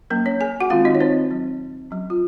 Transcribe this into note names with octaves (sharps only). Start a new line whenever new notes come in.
F#3 A#3 C#4 A#4
C#4 C#5
G#4 G#5
F#4 F#5
D#3 G#3 C4 F4 F5
D#4 D#5
C#5
C4 C5
F#3 C4
F#3 C#4
F4